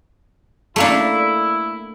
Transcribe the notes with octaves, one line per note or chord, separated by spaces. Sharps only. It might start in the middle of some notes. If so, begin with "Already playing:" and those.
A3 A#3 D4 E4